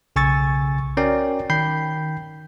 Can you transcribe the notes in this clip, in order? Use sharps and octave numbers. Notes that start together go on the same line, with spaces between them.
B1 C#3 G#5 C#6 E6 A6
C#4 F#4 A#4 D5 G5
D#3 G5 B5 G6 C7